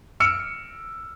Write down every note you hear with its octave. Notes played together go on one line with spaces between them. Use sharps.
E6 F6 C#7 D7